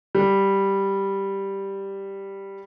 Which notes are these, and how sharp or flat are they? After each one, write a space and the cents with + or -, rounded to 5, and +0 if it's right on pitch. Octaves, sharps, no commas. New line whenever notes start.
G3 +0